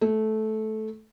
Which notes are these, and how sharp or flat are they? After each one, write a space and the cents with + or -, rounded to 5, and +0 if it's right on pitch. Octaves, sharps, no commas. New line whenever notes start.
A3 -15